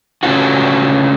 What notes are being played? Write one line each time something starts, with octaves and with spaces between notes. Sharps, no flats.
C#3 A3 C#4 F4 F#4